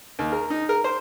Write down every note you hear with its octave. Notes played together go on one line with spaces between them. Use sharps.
D#2
A#4
D#4
A#4
C5